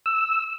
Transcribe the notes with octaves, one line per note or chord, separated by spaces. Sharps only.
E6